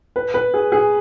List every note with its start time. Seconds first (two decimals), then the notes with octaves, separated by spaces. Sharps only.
0.16 B4
0.34 B4
0.54 G#4
0.72 G#4